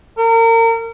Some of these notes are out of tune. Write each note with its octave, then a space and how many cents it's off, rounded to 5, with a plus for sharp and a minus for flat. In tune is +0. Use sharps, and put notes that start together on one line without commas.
A#4 -35